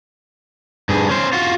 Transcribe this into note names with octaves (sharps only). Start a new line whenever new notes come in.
G2 G#4
C#4 C5
F4 F#4